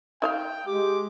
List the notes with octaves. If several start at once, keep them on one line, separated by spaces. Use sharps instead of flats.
D#4 E5 F5 G5
G#3 G4 D6